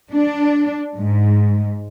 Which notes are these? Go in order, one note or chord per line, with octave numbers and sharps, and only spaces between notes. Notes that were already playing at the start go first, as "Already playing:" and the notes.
D4
G#2